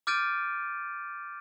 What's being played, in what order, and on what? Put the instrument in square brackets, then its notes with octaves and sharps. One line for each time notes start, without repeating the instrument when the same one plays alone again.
[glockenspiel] D6 F6 G6 A6 D7 D#7